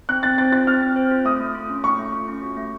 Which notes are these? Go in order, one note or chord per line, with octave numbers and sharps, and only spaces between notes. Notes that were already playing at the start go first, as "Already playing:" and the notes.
C4 F#6
C4 A6
C5 A6
F4 A6
C4 F6
C4
C5
F4
A3 D#6
A3
F4
C#4
A3 C#6
A3
F4
C#4
F#4
A3